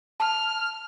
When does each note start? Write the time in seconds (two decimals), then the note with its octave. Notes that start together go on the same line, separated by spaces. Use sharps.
0.20 A5 F6